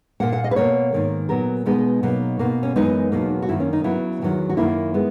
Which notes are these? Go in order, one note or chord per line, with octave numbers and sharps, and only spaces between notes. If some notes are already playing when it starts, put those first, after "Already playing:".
A#2 A#3 F#5
F#5
D#5
B4
B2 A#3 C#5
G#2 D#3 A#3
A#2 F#3 B3 A#4
B2 G#3 B3 D#4
B2 F#3 A#3
B2 A#3
C#4
F#2 E3 G#3 B3 D#4
E2 B2 F#3 A#3
F#4
F#2 D#3 A#3 E4
C#4
D#4
C#3 F#3 B3 E4
E2 D#3 F#3
F#4
F#2 D#3 A#3 E4
G#3 B3